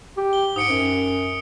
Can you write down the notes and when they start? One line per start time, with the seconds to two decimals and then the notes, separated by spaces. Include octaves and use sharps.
0.17 G4
0.33 G7
0.56 G#2 D#6 C#7 D7
0.69 F#2